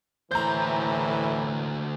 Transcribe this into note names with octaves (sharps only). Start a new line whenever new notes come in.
D2 A2 E3 C5 A#5 G6